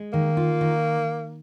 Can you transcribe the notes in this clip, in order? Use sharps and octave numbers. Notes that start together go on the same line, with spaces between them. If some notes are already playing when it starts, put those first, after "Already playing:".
Already playing: G#3
D#3 A#3
F4
D#3